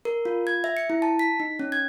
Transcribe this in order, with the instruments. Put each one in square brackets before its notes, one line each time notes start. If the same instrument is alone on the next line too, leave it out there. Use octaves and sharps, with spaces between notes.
[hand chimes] A#4
F4
G#6
E5
C#7
E4
A5
B6
D#4
C#4
G#6